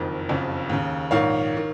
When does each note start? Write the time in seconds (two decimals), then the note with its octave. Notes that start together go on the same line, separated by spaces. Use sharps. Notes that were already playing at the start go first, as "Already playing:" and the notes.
Already playing: F#1 F2 D#3
0.29 F#1 F2 C#3
0.70 D#2 C#3
1.11 A#1 G#2 D#3 C#5 F5
1.57 D#3